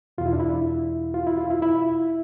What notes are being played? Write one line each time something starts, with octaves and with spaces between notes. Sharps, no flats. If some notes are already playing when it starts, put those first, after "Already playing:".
E2 B2 F4
E4
D4
E4
F4
E4
F4
E4
E4